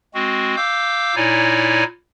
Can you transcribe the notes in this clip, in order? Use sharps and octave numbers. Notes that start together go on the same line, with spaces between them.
G#3 C4 F#4
F5 D6 E6 G6
A#2 D#4 E4 C#5 D5 G#5